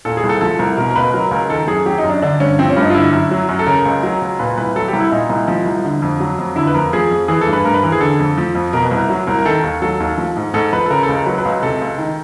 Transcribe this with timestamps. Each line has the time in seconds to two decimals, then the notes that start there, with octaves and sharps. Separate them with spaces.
0.05 A#2 A4
0.17 G#4
0.24 C2
0.29 A4
0.41 F3 A4
0.59 C2 A#4
0.77 B2 A#4
0.90 A#4
0.96 C#2 B4
1.13 F#3 A#4
1.31 C#2 A#4
1.49 D#3 A4
1.68 F#2 G#4
1.86 F#3 G4
1.98 D#4
2.04 F#2
2.10 D4
2.22 D3 D4
2.40 G2 C#4
2.59 F3 C4
2.70 C#4
2.77 G2
2.82 D#4
2.90 F4
2.95 D3 E4
3.12 F#2
3.31 F#3
3.49 F#2
3.59 A4
3.66 C#3 A#4
3.85 C#2
4.03 F#3
4.22 C#2
4.39 A#2 B4
4.58 C2 B4
4.76 F#3 A4
4.88 G4
4.93 C2
5.00 E4
5.11 A#2 D#4
5.30 C2
5.48 F3
5.66 C2
5.85 D3
6.02 F2
6.20 F#3
6.38 F2
6.56 D3 E4
6.67 B4
6.74 F2 A#4
6.93 F3 G#4
7.11 F2
7.28 E3 G#4
7.41 A4
7.47 G2
7.53 B4
7.65 G2 A#4
7.74 B4
7.82 E3 A#4
7.92 G#4
8.00 D3 A4
8.19 F2
8.38 F3
8.55 F2
8.73 B2 A#4
8.85 B4
8.91 C2
8.97 A#4
9.10 F#3
9.27 C2 A#4
9.39 A#4
9.45 D#3 A4
9.63 D#2
9.82 F#3 A4
10.00 D#2
10.18 F3
10.37 G#2
10.54 G#2 A4
10.72 F3 B4
10.86 A4
10.91 C#3 A#4
11.03 A4
11.09 C#2
11.14 A#4
11.26 F#3 B4
11.38 B4
11.45 C#2
11.62 C3 A4
11.81 C#2
11.98 D#3